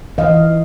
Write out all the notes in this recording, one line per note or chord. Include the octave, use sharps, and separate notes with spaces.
E3 D#5 F5